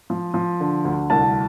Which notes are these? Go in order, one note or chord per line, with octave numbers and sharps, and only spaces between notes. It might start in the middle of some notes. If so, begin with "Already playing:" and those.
F3
F3
D3
D2
C2 A5